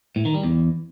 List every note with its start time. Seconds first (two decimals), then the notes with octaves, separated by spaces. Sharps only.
0.16 A2
0.25 D#3
0.34 G3
0.43 E2